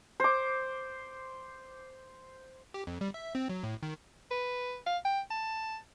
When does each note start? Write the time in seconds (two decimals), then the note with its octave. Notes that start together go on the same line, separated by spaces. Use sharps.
0.20 C5 D6
2.74 G4
2.87 F2
3.01 G3
3.14 E5
3.35 C4
3.49 F#3
3.63 A2
3.83 D#3
4.31 B4
4.86 F5
5.05 G5
5.30 A5